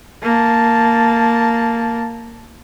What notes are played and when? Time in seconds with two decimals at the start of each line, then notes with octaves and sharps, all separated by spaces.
0.23 A#3 A5